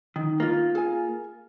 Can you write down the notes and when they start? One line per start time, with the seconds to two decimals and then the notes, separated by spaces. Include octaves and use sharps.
0.16 D#3 D#4
0.40 A#3 F4
0.75 G#4 G#5